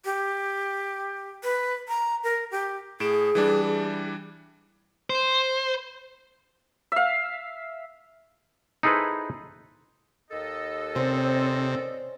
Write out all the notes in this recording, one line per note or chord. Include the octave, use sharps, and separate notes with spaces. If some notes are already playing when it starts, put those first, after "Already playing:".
G4
B4
A#5
A#4
G4
A2 G#4 D7 E7
E3 G3 D4
C5
E5 F5
D#4 E4 G#4 A4 B4 C5
D#2 A4 D#5
C3 C4 C#4 C5 D5